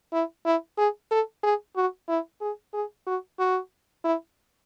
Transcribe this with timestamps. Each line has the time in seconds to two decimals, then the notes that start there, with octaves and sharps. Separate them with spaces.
0.13 E4
0.45 E4
0.78 G#4
1.11 A4
1.43 G#4
1.76 F#4
2.08 E4
2.41 G#4
2.73 G#4
3.06 F#4
3.39 F#4
4.04 E4